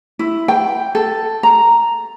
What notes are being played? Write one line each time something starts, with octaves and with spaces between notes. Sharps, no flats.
E4
G5
A4
A#5